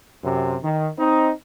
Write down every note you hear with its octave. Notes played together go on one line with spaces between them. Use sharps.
F#2 C3
D#3
C4 D#4